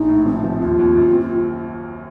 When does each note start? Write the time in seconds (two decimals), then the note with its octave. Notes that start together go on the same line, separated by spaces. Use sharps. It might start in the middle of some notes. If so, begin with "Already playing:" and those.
Already playing: A#1 D#4
0.09 A2
0.26 F3 C4
0.43 F3
0.61 D#2 F4
0.79 D#2
0.97 F#2
1.13 C4
1.20 F4